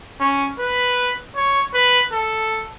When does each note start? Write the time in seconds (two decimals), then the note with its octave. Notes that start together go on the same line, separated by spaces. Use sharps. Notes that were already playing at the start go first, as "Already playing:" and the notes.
0.20 C#4
0.59 B4
1.36 C#5
1.74 B4
2.12 A4